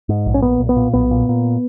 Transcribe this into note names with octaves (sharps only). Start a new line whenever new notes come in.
G#2
A#1
C#4
A#2 B3
B1
B3
A#2
B1 B3
A#2
A#2